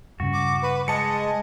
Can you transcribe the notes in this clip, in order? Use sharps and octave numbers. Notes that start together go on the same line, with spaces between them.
G2 C#3 F#4
D6
B4
G#3 D#5 A5 C#7